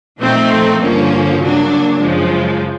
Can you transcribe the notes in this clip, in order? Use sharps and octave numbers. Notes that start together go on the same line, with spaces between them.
A#2 F3 A3 C4 D#4
G2 D3 F3 A#3 C#4
C#3 F#3 A#3 D4
F#2 C#3 F3 G#3